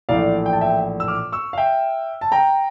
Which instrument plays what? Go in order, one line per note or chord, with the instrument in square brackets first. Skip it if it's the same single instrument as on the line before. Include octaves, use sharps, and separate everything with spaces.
[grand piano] A#1 A2 E3 D5 F5
G5
A5
E5 G5
E6
D6 F6
C#6 E6
F5
E5 G5
A5
G5 A#5